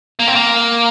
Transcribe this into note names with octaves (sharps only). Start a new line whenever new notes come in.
A#3
C4
A#3